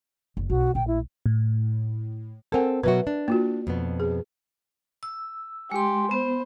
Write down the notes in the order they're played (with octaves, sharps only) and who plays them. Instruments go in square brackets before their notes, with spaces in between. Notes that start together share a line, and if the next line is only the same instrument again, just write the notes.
[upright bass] F#1
[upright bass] B1 [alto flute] F#4
[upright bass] A#1 A3 [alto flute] G5
[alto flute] E4
[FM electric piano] A2
[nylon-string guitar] C4 A4 [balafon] A#4 F#5 G#5
[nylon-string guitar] B2 F#3 F#4 [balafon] B4 E5
[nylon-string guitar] D4
[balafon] A#3 F4 F#4
[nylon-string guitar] F2 B2 B3
[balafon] G#4
[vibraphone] E6
[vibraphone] G#3 C6 [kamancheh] G4
[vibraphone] B3 [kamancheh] C5